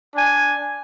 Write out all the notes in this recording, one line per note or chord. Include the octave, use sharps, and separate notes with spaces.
D4 G#5